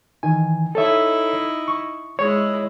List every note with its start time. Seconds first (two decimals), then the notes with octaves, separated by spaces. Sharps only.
0.23 D#3 E3 G#5
0.75 D#4 E4 A4 C#5 E5
1.68 C#6
2.19 G#3 E4 C#5